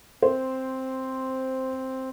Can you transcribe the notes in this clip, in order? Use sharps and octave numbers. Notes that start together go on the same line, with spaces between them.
C4 C5